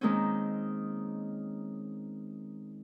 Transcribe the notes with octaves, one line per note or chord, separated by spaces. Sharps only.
D#3 G#3 A#3 C4 C#4